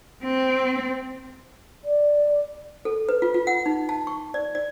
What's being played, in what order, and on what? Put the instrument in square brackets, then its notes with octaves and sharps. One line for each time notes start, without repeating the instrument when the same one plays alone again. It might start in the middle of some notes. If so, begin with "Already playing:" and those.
[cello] C4
[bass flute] D5
[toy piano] A4
B4
F4
F4
F#5
D#4
A5
C#6
D5
D5